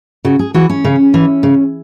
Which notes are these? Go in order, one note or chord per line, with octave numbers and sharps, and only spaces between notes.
C#3 F#4
G#4
E3 F#4
C#4
C#3
E3
C#3